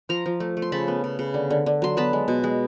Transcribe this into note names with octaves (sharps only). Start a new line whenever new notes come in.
F3 A#5 C6
F3
A3
A3
C6
C#3 A5 B5
B3
C#3
C#3
D3
D3
D3
F#3 C6
B3 A5 B5
G#3
B2
G#3